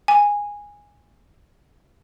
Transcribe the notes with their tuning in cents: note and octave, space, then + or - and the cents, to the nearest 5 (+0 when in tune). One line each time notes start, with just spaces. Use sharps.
G#5 -10